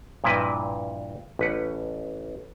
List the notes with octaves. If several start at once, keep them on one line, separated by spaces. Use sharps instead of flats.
G2 A#2 F3 E4 B4 D#5
A1 B4 F#5